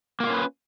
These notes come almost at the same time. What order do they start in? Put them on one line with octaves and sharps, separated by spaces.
A#3 F#4 F4 C#4 B4